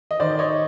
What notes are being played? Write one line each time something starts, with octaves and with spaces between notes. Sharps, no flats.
D#5
D#3 C5 D5
C#5 D#5